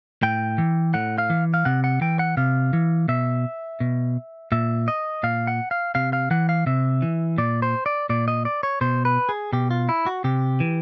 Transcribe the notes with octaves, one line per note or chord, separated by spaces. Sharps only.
A2 G5
E3
A2 F#5
F5
E3
F5
C3 F#5
F#5
E3 G5
F#5
C3 F5
E3
B2 E5
B2
A#2 E5
D#5
A#2 F5
F#5
F5
C3 F5
F5
E3 F#5
F5
C3 E5
E3
A#2 D5
C5
D5
A#2 D5
D#5
D5
C#5
B2 C5
B4
G#4
B2 G4
F4
E4
F#4
C3 G4
E3